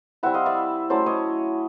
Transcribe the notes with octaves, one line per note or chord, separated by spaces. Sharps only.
G3 C4 E4 E5 F#5
D#5 F5
D5 E5
F#3 A3 C#4 E4 C5 D5
C#5 D#5